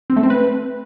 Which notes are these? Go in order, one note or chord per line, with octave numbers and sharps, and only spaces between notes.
C4
A3
C4
B4